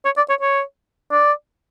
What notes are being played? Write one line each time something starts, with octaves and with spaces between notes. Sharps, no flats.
C#5
D5
C#5
C#5
D5